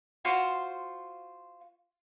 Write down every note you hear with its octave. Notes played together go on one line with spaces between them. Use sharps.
F4 F#4 C5 F5